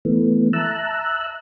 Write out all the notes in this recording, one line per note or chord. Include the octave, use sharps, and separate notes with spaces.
E3 A3 B3
E5 A5 A#5 E6 F#6